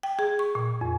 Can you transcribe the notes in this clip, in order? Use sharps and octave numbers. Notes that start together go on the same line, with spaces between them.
G5
G#4
C#6
A#2
F2